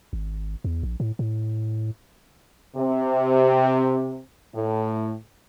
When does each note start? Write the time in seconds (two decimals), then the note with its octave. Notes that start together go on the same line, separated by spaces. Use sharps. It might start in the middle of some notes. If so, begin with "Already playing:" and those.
0.13 G#1
0.64 E2
0.83 A#1
1.00 A2
1.19 A2
2.76 C3
4.55 A2